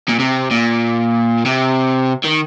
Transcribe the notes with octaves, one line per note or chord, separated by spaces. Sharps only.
A#2
C3
A#2
C3
D#3